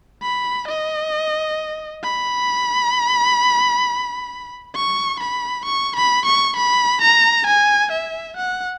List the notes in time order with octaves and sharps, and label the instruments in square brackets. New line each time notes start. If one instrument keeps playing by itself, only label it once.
[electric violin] B5
D#5
B5
C#6
B5
C#6
B5
C#6
B5
A#5
G#5
E5
F#5